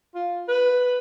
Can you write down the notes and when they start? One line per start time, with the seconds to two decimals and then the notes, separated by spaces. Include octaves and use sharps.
0.15 F4
0.49 B4